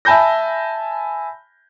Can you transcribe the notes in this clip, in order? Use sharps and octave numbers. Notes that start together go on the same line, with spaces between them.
E5 G#5 A5 B5 G6 A#6